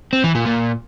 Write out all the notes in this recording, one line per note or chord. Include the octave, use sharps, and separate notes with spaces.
C4
E3
A#2
A#2